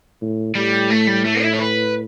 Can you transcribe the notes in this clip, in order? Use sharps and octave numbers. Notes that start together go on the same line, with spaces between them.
A2
A2 G3
A3
G3
A3
E4
C#5
B4